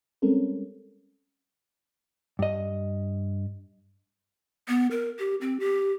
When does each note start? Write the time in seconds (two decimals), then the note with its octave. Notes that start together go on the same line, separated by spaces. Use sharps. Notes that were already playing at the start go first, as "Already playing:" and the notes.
0.22 G3 G#3 C4 C#4 A4 A#4
2.39 G2 D#5
4.68 B3
4.91 A#4
5.19 G4
5.41 C4
5.60 G4